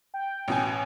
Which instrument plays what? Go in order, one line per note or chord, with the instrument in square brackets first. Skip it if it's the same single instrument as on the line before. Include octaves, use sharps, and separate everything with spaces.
[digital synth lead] G5
[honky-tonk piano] A1 B2 G#5